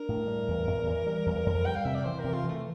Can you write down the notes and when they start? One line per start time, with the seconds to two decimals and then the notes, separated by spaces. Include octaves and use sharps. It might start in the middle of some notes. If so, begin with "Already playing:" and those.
Already playing: D4 A#4
0.09 A2
0.28 G3
0.48 E2
0.67 E2
0.87 E3
1.06 G3
1.26 E2
1.46 F2
1.65 G3 G5
1.75 F5
1.85 C3 E5
1.95 D5
2.04 E3 C5
2.19 C3 A#4
2.34 F4
2.44 E3 A3